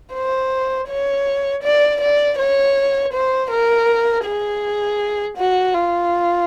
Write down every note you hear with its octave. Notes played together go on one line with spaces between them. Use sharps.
C5
C#5
D5
D5
C#5
C5
A#4
G#4
F#4
F4